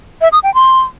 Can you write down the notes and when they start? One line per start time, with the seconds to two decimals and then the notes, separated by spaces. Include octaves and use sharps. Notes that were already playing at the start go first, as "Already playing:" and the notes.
0.21 E5
0.32 D#6
0.43 G5
0.54 C6